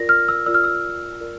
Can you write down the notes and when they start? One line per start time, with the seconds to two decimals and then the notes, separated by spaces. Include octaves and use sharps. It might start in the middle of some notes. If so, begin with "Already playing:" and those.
Already playing: F4 A#4 D5 A#6
0.09 F6
0.28 E6
0.46 F4 A#4 D5 E6
0.54 F6
0.64 E6
1.20 F4 A#4 D5